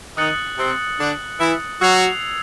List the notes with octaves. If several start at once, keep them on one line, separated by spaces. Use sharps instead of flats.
D#3 D#4 D#6 F#6 A6 C#7 F#7
C3 C4
D3 D4
E3 E4
F#3 F#4 E6 G#6 C7 F7